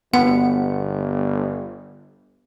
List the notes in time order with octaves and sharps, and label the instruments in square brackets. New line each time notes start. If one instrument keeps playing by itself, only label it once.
[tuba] G1 [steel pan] B3 [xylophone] F#5